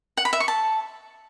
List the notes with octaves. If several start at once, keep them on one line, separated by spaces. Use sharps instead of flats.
F#5
B5
E5
C#6
A5